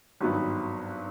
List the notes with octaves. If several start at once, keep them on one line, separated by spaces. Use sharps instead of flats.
G#1 G2 D#3 F#3 B3